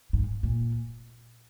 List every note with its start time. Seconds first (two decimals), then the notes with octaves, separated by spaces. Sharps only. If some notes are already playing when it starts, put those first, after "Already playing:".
0.13 G#2
0.43 A#2